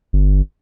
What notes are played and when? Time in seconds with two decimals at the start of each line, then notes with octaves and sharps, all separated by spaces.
0.13 G1